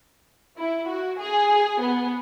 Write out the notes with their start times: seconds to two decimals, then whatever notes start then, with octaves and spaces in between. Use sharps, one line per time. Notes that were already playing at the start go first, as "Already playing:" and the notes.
0.58 E4
0.89 F#4
1.19 G#4
1.81 B3